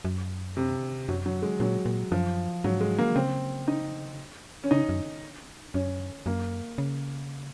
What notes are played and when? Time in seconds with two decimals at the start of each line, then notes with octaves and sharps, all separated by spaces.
0.05 F#2
0.57 C3
1.08 F#2 F#3
1.26 F#3
1.42 G#3
1.60 A#2 F#3
1.86 A#2
2.12 F#2 F3
2.64 G#2 F#3
2.81 G#3
2.98 A#3
3.16 C#3 C4
3.68 D#4
4.64 C#4
4.71 C#3 D#4
4.89 F#2
5.74 F#2 C#4
6.26 F#2 A#3
6.78 C#3